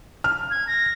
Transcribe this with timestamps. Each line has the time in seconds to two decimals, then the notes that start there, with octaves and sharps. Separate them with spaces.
0.24 F6
0.51 G#6
0.67 A#6